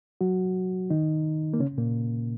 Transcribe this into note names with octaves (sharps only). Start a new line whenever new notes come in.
F#3 F#4
D#3 D#4
A#3
C#3 C#4
A#2 A#3